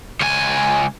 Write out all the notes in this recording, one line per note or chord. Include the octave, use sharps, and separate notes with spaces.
C#2 G#5